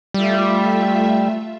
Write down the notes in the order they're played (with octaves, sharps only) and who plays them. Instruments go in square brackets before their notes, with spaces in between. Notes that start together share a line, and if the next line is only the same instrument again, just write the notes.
[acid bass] G3 [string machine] A3 F4 E5